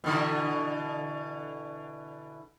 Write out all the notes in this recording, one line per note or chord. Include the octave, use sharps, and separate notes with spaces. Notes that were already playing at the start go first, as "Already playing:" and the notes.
B2 D3 E3